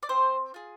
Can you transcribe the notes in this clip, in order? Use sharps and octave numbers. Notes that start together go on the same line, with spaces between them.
D5
C4 C5
F4 G#4